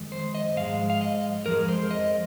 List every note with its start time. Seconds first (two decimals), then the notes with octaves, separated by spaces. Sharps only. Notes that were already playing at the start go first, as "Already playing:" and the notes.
Already playing: F2 D#3 G#3
0.12 C5
0.35 D#5
0.57 G#2 F3 G#3 F5
0.90 F5
1.01 D#5
1.46 F2 F3 G#3 A#4
1.69 C5
1.91 D#5